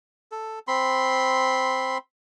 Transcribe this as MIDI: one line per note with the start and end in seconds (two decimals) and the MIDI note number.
0.32 0.59 69
0.68 1.98 60
0.68 1.98 83
0.68 1.98 84